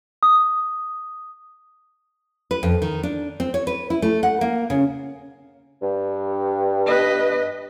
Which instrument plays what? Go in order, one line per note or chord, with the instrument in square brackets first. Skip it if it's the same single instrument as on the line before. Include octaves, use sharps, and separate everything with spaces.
[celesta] D#6
[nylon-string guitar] B4
F2
D#3
D4
C4
C#5
B4
E4
A3
F#5
A#3
C#3
[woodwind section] G2
[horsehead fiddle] B4 D#5